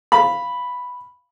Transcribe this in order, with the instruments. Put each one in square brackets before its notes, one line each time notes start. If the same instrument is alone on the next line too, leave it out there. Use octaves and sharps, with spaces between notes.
[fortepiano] F5 B5